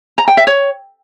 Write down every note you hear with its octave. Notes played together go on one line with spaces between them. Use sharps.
A#5
G5
E5
C#5